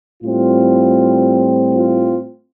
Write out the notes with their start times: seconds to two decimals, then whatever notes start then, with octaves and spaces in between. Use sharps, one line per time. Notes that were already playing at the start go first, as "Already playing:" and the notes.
0.23 A2 G3 C4 F4
1.74 F4